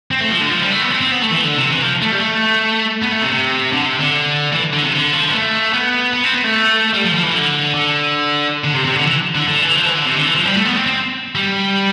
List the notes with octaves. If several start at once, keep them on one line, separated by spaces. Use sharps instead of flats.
C4
A3
F3
D3
F3
G3
A3
B3
C4
C4
B3
A3
E3
D3
C3
E3
F3
A3
G3
A3
B3
A3
C3
C3
D3
C3
D3
E3
D3
C3
D3
F3
B3
A3
B3
B3
C4
B3
A3
G3
F3
F3
E3
D3
D3
D3
C3
C3
D3
E3
D3
D3
E3
F3
E3
D3
C3
D3
E3
F3
G3
A3
B3
C4
C4
G3